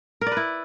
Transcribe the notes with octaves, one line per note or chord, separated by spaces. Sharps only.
A#4
D5
B4
E4